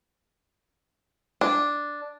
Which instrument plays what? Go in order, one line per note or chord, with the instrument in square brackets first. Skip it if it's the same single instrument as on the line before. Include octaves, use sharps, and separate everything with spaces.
[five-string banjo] D4